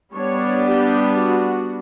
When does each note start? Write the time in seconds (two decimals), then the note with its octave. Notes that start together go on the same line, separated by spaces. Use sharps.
0.15 G3 B3 D4 C#5
0.67 G4
1.20 F#4